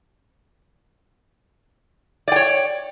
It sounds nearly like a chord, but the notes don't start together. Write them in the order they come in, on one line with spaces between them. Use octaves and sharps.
D5 G5 C#5